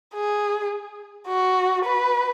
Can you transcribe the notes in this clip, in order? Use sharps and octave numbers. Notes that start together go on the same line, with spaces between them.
G#4
F#4
B4